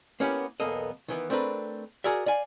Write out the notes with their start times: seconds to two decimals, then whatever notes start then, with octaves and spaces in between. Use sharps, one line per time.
0.20 A#3 B3 C#4 E4 G4 F#5
0.60 B1 E2 A#3 B3 A4 D#5
1.08 D#3 E3 B3
1.30 A3 C4 D4 A#4 B4
2.04 F#4 G#4 A#4 D5 E5
2.26 D5 F5 G#5